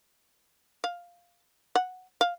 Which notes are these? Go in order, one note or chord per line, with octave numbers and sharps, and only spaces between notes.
F5
F#5
F5